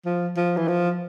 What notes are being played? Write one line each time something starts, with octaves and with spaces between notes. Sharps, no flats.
F3
F3
E3
F3